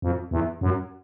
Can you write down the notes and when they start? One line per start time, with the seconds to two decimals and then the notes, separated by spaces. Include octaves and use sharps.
0.02 F2
0.31 E2
0.61 F#2